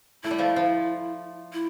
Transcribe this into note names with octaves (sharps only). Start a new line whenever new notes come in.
A3 E4
G3
F3 A3
F3
E4